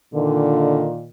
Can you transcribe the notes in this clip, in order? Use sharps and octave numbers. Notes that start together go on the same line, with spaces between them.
A#2 D3 D#3